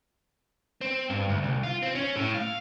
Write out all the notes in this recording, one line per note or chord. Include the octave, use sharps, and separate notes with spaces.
C4
G2
D2
C2
F4
C4
C#4
A2
F5